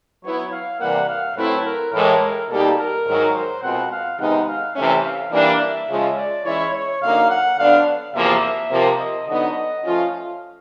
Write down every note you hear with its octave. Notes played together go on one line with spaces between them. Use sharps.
F#3 B3 E4 C#5
F5
C3 E3 G3 A#3 F#5
F5
A2 F#3 A3 C4 E4 B4
A#4
A2 E3 G#3 A#4
B2 G3 A#3 D#4 G4 A4
A#4
G#2 D#3 F#3
C5
B2 G#3 C4 F4 A#4 F#5
F5
C3 D#3 G#3 B3 D#4 F#5
F5
C3 E3 A3 C#4 E5
F5
E3 G3 A#3 D4 F5
E5
C#3 F3 G#3
D5
E3 G#3 C#4 E4 C#5
C#5
F#2 D3 F#3 A#3 D#4 F5
F#5
D3 F#3 B3 D4 F5
E2 C3 F3 A#3 E5
C3 F3 A#3
D#5
D3 F#3 B3 D#4 D#5
F3 A3 C#4 F4
F5